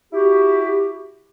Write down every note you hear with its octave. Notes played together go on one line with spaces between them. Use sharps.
E4 F#4 G4